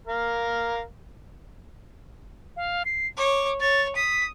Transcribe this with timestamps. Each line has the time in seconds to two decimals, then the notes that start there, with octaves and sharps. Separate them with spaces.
0.07 A#4 F5
2.56 F5
2.85 C7
3.17 C#5 D6
3.60 C#5 A6
3.96 D#6 B6